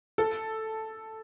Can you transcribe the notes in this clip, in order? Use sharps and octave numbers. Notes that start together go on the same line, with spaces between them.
A4